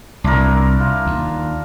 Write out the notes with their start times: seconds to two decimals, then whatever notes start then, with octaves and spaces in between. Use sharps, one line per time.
0.24 C2 D4 E4 A#4
0.80 F4
1.07 D#2